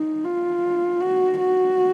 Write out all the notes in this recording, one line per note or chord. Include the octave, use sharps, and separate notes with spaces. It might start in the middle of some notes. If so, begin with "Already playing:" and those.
Already playing: D#4
F4
F#4
F#4